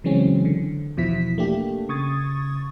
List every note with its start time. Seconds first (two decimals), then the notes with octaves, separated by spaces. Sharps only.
0.04 C#3 E3 F#3 G#3 C4 C#4
0.45 D3
0.97 E2 B2 F3 E4 B6
1.38 A3 A#3 D4 G4
1.89 C#3 C#6 D#6 G#6 A6